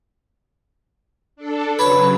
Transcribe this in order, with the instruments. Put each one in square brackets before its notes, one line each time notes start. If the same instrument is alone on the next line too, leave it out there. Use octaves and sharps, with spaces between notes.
[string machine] D4 A4
[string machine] C#3 F#3 [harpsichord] B4 C#5 C#6